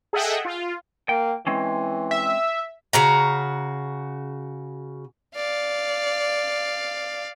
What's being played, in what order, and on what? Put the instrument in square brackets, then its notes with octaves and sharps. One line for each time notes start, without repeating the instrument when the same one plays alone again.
[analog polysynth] G#4 A4 D#5 E5 F#5 G5
F4
[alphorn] A#3 [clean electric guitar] G5
[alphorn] E3 [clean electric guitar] G#3 C4 C#4
[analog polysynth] E5
[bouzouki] C#3 F#4 A#5
[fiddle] D5 F5